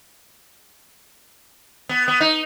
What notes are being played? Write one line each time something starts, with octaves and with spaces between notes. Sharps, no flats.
B3
B3
D#4